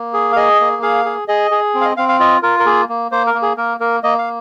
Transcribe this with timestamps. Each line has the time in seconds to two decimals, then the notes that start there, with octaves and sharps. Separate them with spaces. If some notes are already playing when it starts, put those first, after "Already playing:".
Already playing: A#3
0.14 G#4
0.32 F5
0.36 G#4 D#5
0.60 A#3
0.82 G#4 F5
1.05 G#4
1.28 G#4 D#5
1.51 G#4
1.74 C4
1.81 F5
1.85 D#5
1.97 C4 F5
2.09 F5
2.20 F4 D#5
2.43 F4 A#4
2.59 A#4
2.66 A#3 G#4
2.89 A#3
3.12 A#3 C5
3.27 A#4
3.34 A#3
3.42 G#4
3.57 A#3 A#4
3.80 A#3 A#4
4.03 A#3 D#5
4.19 F5